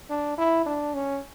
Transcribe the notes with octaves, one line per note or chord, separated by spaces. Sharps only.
D4
E4
D4
C#4